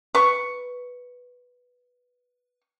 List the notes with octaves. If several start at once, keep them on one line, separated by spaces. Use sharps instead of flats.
B4 C#6